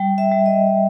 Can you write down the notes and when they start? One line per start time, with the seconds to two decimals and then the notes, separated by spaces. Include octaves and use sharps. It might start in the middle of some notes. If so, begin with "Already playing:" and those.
Already playing: G3 G5
0.18 E5
0.31 G3
0.46 D#5